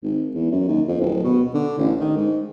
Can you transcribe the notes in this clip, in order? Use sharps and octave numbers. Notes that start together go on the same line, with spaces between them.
G#1
E2
F#2
D#2
F2
D1
B2
D3
A1
D#3
G#2